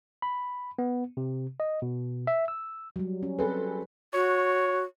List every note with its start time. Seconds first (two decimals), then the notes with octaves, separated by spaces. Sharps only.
0.22 B5
0.78 B3
1.17 C3
1.60 D#5
1.82 B2
2.27 E5
2.48 E6
2.96 F#3 G3
3.23 C#4
3.39 C4 G#4 A4 B4
4.14 F#4 C#5